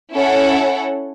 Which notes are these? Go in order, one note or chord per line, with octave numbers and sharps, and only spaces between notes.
C#4 E4 A4 C#5 F#5